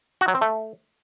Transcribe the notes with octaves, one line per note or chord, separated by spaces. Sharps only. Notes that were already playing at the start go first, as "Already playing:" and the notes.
F#4
F#3
C4
A3